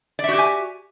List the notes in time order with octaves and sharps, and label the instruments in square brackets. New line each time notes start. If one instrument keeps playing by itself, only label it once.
[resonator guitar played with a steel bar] D5
E5
F#4
G4
G#5